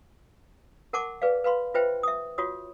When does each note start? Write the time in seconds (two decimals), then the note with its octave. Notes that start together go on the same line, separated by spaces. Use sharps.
0.93 A#4 F#5 A5 C#6 D6
1.22 G#4 B4 D5 F5
1.44 B4 F5 B5 C6
1.74 F4 B4 C5 E5 G5
2.03 E5 D#6
2.38 F4 F#4 C#5 D#6